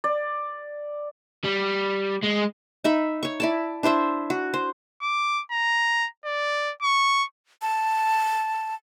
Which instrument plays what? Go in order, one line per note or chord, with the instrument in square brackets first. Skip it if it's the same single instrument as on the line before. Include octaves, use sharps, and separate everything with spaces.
[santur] D5
[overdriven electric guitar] G3
G#3
[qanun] D#4 E5 B5
C#5 C#6
E4 D5 A5
D4 E4 C5 E5
F#4
C5
[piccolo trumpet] D6
A#5
D5
C#6
[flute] A5